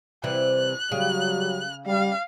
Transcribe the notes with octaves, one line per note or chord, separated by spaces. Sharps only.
C3 E3 G3 F#6
C#3 F#3 G3
G3 F5